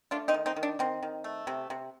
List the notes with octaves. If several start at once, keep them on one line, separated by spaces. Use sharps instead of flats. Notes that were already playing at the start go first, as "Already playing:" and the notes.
A3 D4 F4
C4 D#4
D#3
C4 D#4
D#3
D4
D#3 C4
D#3
A3
C3
C3